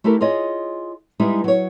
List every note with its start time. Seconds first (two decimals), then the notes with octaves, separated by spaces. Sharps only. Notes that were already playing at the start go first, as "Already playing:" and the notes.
0.04 A3 E4 G4 A4 A#4
0.21 F4 G#4 C#5 D#5
1.20 G3 G#3 B3 D#4 E4
1.44 F#3 C#5